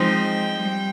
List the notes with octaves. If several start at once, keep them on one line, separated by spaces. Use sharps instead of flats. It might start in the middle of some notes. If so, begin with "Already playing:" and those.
Already playing: F3 G#3 C4 D#4 G5
G3